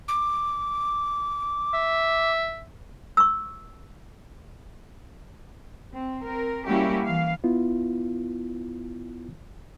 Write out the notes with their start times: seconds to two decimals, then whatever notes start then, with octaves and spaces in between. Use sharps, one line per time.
0.08 D6
1.74 E5
3.17 C#6 E6
5.93 C4
6.23 C4 A#4
6.67 G3 A#3 C#4 E4 F#4 G4
7.06 E3 F5
7.44 B3 E4 F4